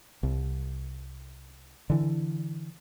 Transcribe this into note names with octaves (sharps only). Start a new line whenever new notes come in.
C2
D3 E3